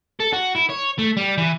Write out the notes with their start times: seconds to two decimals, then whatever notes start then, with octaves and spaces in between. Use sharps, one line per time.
0.20 A4
0.33 F#4
0.55 E4
0.69 C#5
0.99 A3
1.17 G3
1.38 E3